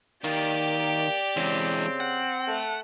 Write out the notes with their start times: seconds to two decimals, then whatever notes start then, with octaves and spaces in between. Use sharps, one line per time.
0.24 D#3 A#3 G4 D5
1.37 C#3 E3 G#3 C4
2.00 F#5
2.47 A3 A4